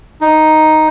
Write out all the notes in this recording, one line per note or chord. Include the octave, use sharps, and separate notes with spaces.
D#4